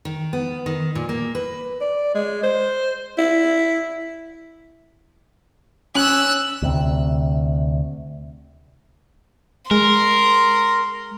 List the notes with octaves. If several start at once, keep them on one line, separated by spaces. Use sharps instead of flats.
D#3
B3
D#3
A#2
A#3
B4
D5
G#3
C5
E4
C#4 E6 F#6
D2 C3
G#3 A#4 C6